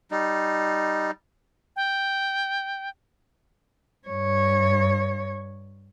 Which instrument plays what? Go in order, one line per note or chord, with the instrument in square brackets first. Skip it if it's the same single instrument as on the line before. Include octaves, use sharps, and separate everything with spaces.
[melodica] G3 D#4
[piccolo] G5
[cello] G2 C#5